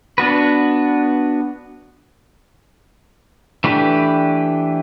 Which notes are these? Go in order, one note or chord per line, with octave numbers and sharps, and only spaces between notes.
B3 D4 F#4 B4
E3 A3 D4 G4 B4